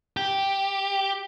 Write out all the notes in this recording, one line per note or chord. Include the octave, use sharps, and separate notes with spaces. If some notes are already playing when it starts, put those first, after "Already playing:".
G4